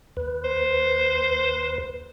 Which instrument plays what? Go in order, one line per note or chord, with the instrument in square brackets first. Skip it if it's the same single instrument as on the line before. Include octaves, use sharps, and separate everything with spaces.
[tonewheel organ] D#2 B4
[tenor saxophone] C5